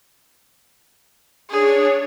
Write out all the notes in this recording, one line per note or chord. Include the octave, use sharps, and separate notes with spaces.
D4 G#4 C#5